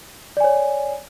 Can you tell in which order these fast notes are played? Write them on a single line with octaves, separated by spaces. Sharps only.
D5 G#5 C#5